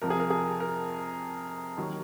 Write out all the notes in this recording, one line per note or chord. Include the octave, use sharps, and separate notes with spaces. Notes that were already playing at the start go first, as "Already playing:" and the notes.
F2 C3 F3 A#4
G#4
A#4
G#4
A#4
D#2 D#3 F#3